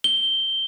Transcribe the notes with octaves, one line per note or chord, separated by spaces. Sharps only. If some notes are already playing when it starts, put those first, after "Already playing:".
G7